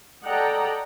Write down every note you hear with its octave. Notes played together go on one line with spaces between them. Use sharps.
A4 D5 D#5 F#5 G5 A#5